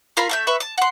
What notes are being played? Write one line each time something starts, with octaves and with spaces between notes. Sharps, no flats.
F4 A#4 F5 B5
A3 E5 G6
B4 E5 C#6
A5
F#5 C6